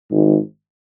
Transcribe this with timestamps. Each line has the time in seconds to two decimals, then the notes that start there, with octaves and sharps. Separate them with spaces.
0.09 G#1 G#2